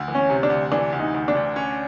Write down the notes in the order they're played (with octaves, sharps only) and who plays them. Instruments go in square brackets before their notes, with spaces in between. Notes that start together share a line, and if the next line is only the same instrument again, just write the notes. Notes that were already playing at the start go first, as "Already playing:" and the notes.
Already playing: [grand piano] D2
E3
[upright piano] C#4
[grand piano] C3
[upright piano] D4
[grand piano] D2
[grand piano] E3 [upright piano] D4
[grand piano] D2
[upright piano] D#4
[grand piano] D2
[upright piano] D4
[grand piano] D2
C#4